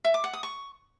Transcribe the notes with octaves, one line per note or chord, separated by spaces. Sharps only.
E5
D6
F#5
D#6
C#6